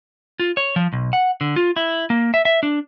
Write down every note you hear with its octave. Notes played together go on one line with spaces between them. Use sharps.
F4
C#5
F3
B1
F#5
D3
F4
E4
A#3
E5
E5
D4